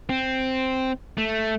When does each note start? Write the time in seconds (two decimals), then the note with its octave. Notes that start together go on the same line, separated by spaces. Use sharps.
0.09 C4
1.18 A3